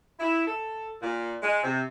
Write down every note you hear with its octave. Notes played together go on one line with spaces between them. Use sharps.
E4
A4
A#2
G#3
C3